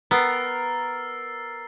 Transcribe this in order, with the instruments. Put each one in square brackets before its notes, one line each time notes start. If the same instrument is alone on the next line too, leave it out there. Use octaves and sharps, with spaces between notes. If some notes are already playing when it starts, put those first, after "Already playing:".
[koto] B3 [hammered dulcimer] A#4 [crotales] E6 A6 C7